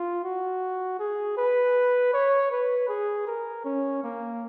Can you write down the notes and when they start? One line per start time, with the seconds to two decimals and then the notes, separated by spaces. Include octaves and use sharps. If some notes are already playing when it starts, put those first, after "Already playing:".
Already playing: F4
0.24 F#4
0.99 G#4
1.37 B4
2.13 C#5
2.52 B4
2.89 G#4
3.27 A#4
3.65 C#4
4.04 A#3